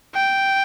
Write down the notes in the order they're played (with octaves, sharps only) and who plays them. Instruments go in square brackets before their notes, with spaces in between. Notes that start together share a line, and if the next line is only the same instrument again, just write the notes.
[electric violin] G5